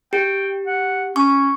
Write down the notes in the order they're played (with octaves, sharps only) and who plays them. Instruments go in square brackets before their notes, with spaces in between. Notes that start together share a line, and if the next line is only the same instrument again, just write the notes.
[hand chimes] G4 [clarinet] G5
[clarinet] F#5
[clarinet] C#4 [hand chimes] C#6